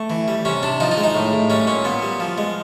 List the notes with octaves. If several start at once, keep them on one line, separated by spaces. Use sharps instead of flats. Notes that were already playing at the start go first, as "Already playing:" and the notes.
Already playing: A3
E3
G3
C3 C#4
C3 D4
F3 D#4
D#4
G#3
D#4
A2
A2
G3 C#4
A#2 C#4
A#2 B3
G3
F3
G#3